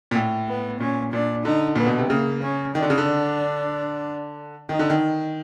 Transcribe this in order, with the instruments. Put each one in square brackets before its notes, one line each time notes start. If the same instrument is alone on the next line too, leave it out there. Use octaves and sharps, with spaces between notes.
[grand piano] A#2
A2
[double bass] B3
[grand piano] A#2 [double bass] C#4
[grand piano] A#2 [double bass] D4
[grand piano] D3 [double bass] D#4
[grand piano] A#2 [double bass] B3
[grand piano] B2
C3
[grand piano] C#3 [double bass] A#3
[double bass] C#4
[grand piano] D#3 [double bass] D4
[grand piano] D3
C#3
D3
[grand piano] D#3 [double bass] D#4
[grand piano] D3
D#3